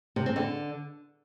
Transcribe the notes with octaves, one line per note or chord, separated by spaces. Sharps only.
C3
C4
D3